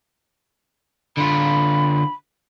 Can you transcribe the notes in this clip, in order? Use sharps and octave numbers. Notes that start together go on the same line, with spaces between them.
D3 F4 B5